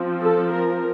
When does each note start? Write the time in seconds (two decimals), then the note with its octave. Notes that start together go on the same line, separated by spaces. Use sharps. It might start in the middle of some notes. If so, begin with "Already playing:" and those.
Already playing: F3 C4
0.22 A4
0.52 A#4